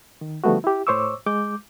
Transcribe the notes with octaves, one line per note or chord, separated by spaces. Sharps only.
D#3
D3 F3 G3 A3 B3 F#4
E4 G4
A2 C5 C#5 C#6 D6 E6
G#3 D6 G6